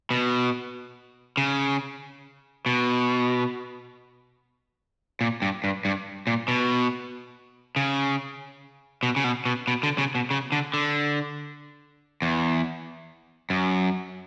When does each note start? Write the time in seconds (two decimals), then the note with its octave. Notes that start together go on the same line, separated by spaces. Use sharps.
0.11 B2
1.37 C#3
2.66 B2
5.21 A#2
5.42 G2
5.64 G2
5.85 G2
6.27 A#2
6.48 B2
7.76 C#3
9.03 B2
9.16 C#3
9.24 B2
9.45 B2
9.68 B2
9.83 D3
9.98 C#3
10.15 B2
10.31 C#3
10.52 D3
10.74 D3
12.22 E2
13.50 F#2